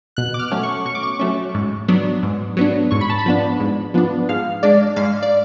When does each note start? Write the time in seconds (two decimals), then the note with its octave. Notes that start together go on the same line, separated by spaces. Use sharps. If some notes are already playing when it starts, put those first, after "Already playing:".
0.17 B2 F#6
0.34 D6
0.39 F6
0.51 F#3 A3 C#4
0.63 C#6
0.85 B2 C#6
0.95 D6
1.03 C#6
1.19 F#3 A3 C#4
1.54 G#2
1.88 F#3 B3 D4
2.23 G#2
2.57 F#3 B3 D4
2.91 G#2 C#6
3.01 B5
3.10 A5
3.19 B5
3.26 F3 B3 D4
3.60 G#2
3.94 F3 B3 D4
4.29 G#2 F5
4.63 G#3 D4 D5
4.96 G#2 F5
5.23 D5